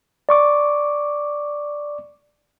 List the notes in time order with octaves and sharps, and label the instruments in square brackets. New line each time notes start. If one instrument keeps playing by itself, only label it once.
[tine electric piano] D5 C#6 D6